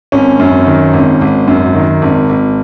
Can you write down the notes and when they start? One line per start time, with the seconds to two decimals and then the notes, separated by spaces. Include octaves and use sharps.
0.12 G#1 C#4
0.39 F#2
0.67 D#3
0.93 G#1
1.21 G#1
1.48 F#2
1.75 D#3
2.02 G#1
2.29 G#1